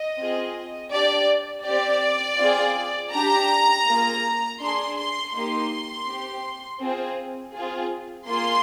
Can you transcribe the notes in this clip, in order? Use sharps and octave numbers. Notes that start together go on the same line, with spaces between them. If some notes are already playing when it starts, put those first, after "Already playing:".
Already playing: D#5
C4 F4 G#4
D4 G4 D5
C4 G4 D5
C4 F4 G#4
D4 G4 A#5
A#3 F4 G#4
D4 G#4 C6
C6
A#3 D#4 G4 C6
C4 G4
C4 F4 G#4
C4 F4 G#4
A#3 F4 G#4 C6